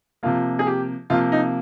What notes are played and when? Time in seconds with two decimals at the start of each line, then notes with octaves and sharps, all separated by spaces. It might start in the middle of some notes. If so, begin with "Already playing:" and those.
0.23 C3 F3 A#3 F4
0.59 G#4
0.67 G4
1.10 C3 F3 A#3 F4
1.32 D#4